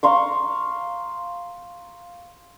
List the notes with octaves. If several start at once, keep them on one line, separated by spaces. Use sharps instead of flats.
F5 A#5 C6 C#6